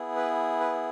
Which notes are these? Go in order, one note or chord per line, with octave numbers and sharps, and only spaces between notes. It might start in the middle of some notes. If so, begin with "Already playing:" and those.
Already playing: B3 E4 G#4
B4
B4